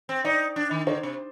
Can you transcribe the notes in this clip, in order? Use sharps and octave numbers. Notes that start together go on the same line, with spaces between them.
C4
D#4 D5
D4
D#3
D3 C5
C3